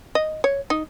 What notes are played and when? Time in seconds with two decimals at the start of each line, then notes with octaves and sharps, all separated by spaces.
0.15 D#5
0.44 C#5
0.70 D#4